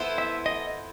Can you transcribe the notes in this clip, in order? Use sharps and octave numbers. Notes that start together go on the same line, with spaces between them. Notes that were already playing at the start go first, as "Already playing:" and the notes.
Already playing: B3 E4 A4 C5
E5
D#5